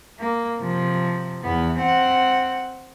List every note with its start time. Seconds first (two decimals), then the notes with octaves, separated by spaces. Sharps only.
0.19 A#3
0.59 C3 F3
1.42 E2 B3
1.79 C4 F#5